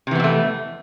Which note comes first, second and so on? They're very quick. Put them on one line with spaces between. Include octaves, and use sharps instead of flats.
C3 E3 B3 F2 A3